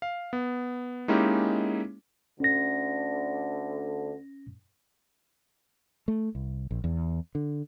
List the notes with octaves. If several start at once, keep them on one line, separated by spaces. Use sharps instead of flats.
F5
B3
G#3 A#3 C#4 D#4 E4 G4
D2 D3 C#4 A#6
A3
C2
A#1
E2
D3